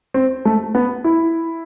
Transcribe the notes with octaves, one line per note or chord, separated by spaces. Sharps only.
C4
A3
B3
E4